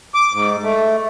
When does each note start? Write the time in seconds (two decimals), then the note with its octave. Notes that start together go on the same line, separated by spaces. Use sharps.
0.14 D6
0.33 G#2
0.63 A3